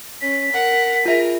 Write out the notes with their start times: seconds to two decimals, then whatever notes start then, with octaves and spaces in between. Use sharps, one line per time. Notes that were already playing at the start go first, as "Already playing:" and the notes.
0.21 C#4 B6
0.52 A#4 F#5
1.05 F4 G#4 A#4 E5